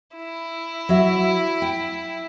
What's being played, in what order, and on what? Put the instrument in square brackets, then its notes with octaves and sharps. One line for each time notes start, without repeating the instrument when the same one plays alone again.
[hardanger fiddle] E4
[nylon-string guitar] F#3 E5
G5